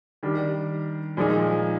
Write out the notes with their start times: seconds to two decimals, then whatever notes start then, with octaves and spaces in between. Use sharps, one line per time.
0.23 D#3 G3 D4 G4
1.17 A#2 F3 G#3 D#4